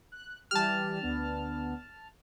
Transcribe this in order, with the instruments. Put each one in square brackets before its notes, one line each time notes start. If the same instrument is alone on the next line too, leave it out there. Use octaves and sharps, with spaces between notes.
[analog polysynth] F#6
[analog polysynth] E3 G3 G4 [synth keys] A5 F6
[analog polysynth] D2 B3 D4